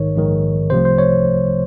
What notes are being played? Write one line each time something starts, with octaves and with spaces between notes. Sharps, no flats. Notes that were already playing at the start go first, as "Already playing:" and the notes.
Already playing: A#1 G#2 D#3 C#5
A#1 G#2 D#3
C2 C3 F3 A3 C5
C5
C#5